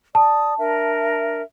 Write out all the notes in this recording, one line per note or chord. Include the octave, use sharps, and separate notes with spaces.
D5 A5 D#6
D4 A#4 E5